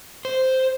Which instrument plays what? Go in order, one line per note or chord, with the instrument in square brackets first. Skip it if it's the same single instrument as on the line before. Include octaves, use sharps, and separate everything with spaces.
[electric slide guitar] C5